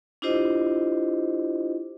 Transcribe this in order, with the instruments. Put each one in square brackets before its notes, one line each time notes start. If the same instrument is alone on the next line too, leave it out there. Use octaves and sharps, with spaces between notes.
[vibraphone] D4 E4 F4 G4 C5 D#5